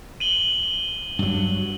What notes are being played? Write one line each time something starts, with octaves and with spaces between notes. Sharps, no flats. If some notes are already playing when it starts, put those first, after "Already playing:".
D#7 F#7 G7
G2 F#3